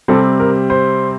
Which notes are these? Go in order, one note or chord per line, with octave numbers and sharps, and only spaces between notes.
C3 G3 C4 A4
A#4
C5